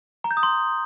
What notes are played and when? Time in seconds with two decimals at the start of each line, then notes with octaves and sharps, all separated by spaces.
0.24 A#5
0.31 G6
0.37 D#6
0.43 C6